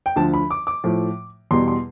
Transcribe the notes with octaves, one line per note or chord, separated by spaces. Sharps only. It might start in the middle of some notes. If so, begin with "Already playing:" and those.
G5
D2 D3 F3 A5
B5
D6
D6
A2 F3
E2 B2 G3 C6
C6